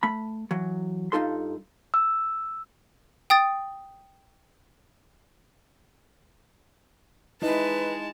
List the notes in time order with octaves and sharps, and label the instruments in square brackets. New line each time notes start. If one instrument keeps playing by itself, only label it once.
[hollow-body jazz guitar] A3 B5
E3 F#3
G2 D#4 F4 A4 C6
[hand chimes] E6
[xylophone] G5 D#6 A6
[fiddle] G#3 A5 [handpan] D#4 E4 D#5 [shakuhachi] B4